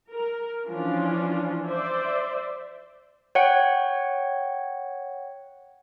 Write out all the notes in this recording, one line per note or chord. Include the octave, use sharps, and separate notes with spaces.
A#4
E3 F3 C#4 D4 F4
C5 D5 E5
C#5 F#5 G5